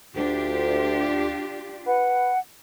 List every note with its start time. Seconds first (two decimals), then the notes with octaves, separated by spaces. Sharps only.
0.16 D2 D4 F4 G4
1.87 B4 F#5